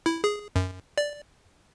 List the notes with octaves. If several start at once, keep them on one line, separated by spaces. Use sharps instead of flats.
E4
G#4
F#2
D5